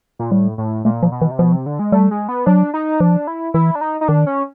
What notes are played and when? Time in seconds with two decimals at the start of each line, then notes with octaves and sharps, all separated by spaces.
0.19 A#2
0.31 A2 G3
0.58 A2
0.85 A#2 A3
1.03 F3
1.12 B2
1.21 E3
1.31 C3
1.38 B2 F3
1.53 C3
1.66 D3
1.79 G#3
1.92 G3 A3
2.11 G#3
2.28 B3
2.46 F#3 D4
2.74 D#4
3.00 F3 D4
3.27 E4
3.54 E3 E4
3.75 D4
3.81 D#4
4.01 D#4
4.08 D#3 D4
4.26 C#4